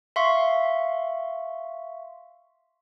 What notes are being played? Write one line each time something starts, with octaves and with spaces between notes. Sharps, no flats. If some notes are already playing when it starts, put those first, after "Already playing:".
E5 F5 C6 C#6